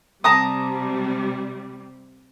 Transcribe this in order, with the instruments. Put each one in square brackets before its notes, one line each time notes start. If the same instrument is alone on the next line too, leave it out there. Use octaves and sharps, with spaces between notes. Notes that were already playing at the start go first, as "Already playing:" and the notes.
[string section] C3 G3 [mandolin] A5 A#5 D#6